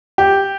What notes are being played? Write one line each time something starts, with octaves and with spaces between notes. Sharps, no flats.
G4